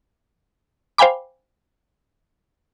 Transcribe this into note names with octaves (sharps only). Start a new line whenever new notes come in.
C5 F5 G5 G#5 B5 D6